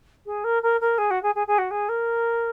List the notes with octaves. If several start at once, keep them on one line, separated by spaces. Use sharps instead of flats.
G#4
A#4
A#4
A#4
G#4
F#4
G#4
G#4
G#4
F#4
G#4
A#4